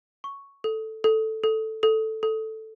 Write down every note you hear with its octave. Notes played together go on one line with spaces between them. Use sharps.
C#6
A4
A4
A4
A4
A4